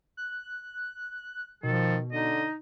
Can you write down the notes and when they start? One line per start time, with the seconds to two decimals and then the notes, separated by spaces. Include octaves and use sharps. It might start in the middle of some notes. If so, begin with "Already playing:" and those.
0.17 F#6
1.63 B2 D#3 F3 A4
2.12 D3 D#4 D#5